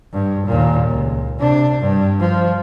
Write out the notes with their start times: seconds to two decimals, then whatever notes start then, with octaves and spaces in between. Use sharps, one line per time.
0.12 G2
0.46 D#2 A#2
0.89 C#2
1.38 C3 D4
1.80 G2
2.19 F3